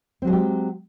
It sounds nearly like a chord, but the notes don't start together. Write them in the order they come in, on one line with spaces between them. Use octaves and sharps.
C4 F#3 G#4 G#3 G4